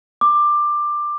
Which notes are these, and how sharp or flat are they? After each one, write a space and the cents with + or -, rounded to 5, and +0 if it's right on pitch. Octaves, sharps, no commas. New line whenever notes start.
D6 +15